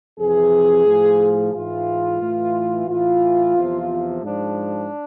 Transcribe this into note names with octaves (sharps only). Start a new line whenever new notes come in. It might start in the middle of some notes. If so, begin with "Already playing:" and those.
F2 C3 E3 G#4
A2 F3
G#2 E3 F4
A2 E3
A2 E3 F4
E2 C3 F3
G#2 F3 D4